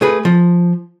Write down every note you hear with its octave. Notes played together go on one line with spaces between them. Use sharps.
A3 G#4 B4
F3